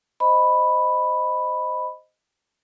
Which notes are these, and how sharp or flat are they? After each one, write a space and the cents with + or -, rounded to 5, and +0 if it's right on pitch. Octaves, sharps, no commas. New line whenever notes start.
C5 +0 D#5 -5 B5 +0